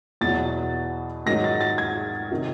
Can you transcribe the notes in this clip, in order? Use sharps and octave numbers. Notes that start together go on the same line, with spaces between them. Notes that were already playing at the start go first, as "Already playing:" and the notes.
E2 B2 F#3 A6
G#2 D#3 F#3 A#6
A6
A6
G#6
C3 D#3